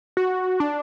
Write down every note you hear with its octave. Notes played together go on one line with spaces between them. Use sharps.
F#4
D4